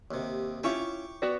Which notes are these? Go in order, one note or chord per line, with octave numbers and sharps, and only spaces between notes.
D#2 C3
C#4 E4 F4 G5 C#6 D6
B3 F#4 D5